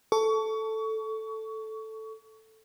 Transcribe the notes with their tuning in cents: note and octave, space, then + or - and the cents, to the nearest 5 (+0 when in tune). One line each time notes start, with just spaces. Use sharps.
A4 +0 C#6 +25